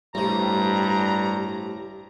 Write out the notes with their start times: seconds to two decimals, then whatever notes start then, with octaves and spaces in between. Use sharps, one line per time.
0.15 A1 G2 C3 G3 A#5